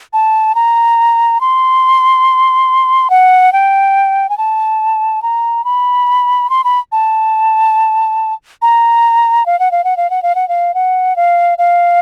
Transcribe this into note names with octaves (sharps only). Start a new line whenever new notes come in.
A5
A#5
C6
F#5
G5
G#5
A5
A#5
B5
C6
B5
A5
A#5
F5
F#5
F5
F#5
F5
F#5
F5
F#5
F5
F#5
F5
F5